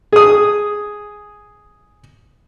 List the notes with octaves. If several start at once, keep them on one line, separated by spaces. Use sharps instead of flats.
G#4 D#6